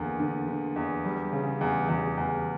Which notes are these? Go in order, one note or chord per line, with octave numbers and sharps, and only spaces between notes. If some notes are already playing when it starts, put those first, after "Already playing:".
Already playing: E2 D3 A#3
D3
D3
E2
G3
C#3
E2
E2
E2